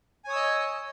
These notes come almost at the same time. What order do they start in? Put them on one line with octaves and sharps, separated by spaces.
G#5 C#5 D#6 E6 D#5